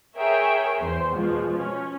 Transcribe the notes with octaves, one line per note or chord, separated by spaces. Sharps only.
G#4 A#4 C#5 E5 G5
E2 C5
B2 F3 G#3
C#4